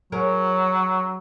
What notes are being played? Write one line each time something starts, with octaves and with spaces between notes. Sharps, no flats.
F#3 C#4 G#4 A#4